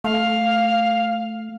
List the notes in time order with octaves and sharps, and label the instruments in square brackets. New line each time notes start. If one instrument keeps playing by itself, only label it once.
[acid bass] A3 [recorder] F5